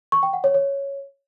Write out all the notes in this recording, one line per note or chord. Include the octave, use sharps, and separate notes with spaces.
C#6
G5
F#5
C#5
C#5